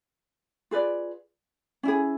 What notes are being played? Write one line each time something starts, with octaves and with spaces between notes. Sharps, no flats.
F4 G#4 B4 D5
C#4 E4 G#4